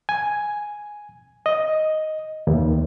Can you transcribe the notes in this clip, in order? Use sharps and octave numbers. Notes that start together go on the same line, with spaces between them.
G#5
D#5
D#2